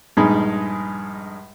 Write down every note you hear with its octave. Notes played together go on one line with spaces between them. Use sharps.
A#1 G2 G#3 D#4 B5